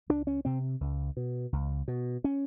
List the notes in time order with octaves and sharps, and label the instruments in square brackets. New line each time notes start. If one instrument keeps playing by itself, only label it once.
[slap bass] C#2 D4
C#4
C3 C4
C#2
B2
C#2
B2
C#4